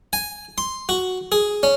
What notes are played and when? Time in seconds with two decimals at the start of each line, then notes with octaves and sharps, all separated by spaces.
0.13 G#5
0.58 C6
0.89 F#4
1.32 G#4
1.63 C#4